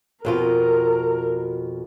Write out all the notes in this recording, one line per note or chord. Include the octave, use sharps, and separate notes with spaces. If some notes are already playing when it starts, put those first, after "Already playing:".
F2 B2 F4 A#4